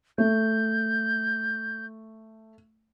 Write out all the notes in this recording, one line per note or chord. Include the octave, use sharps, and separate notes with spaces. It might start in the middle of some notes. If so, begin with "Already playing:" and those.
A3 G6